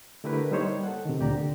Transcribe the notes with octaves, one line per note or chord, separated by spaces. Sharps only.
D3 A3 E4 G4 A#4 B4
G3 A#3 D#4 C5 C#5
A4 F#5
C3 D#3
D2 A#2 G4 D5 A#5
D3